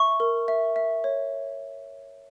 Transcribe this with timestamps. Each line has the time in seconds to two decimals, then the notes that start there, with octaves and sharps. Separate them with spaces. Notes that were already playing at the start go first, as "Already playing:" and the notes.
Already playing: E5 C#6
0.20 A#4
0.48 E5
0.76 E5
1.04 C#5